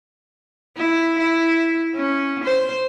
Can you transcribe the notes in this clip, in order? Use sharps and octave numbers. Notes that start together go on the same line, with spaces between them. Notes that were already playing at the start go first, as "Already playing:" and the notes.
E4
E4
C#4
C5